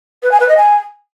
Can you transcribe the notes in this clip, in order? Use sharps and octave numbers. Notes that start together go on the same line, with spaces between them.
B4
G#5
B4
D#5
G#5